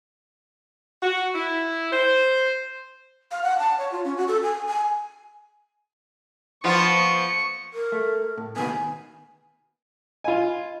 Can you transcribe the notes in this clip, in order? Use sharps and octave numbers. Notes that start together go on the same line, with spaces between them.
F#4
E4
C5
F5
F#5
A5
C#5
F4
C#4
F#4
A4
G#5
G#5
F3 B3 F4 C#6
A#4
A3
A2
B2 D#3 B3 G#5
F4 D#5 F5 G#5 B5